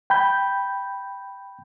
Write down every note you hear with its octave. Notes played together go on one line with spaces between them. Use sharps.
G5 B5 G6